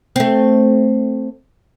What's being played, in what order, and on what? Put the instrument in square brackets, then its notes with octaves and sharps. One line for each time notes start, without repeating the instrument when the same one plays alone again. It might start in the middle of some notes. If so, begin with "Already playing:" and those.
[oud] A3 C4